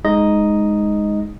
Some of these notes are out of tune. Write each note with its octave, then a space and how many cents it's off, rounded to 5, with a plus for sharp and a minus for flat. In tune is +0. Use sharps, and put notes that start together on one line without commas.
G#3 +0 D#4 +0 D#5 +0